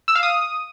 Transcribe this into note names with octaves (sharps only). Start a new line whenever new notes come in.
E6
F5
D#6